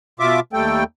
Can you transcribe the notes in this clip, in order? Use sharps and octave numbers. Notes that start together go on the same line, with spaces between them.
B2 F4 E5 D6
D#2 G3 A3 A4 G5